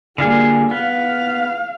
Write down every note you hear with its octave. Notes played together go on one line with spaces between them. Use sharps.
D3 G3 A#3 F4 G#4
B3 F5